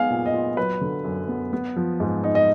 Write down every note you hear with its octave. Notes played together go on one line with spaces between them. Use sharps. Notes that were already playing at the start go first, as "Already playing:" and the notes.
Already playing: G#3 B3 D#4 F5 G#5
A#2
D#5
F4
F#3 B4
D3
F#2
B3
B3
F3
G#2
D#4
D#5